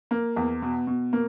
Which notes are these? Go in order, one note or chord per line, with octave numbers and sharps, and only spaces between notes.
A#3
E2
B2
B2
A#3